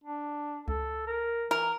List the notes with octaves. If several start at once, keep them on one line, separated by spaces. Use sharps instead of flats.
D4
C#2 A4
A#4
E3 A#4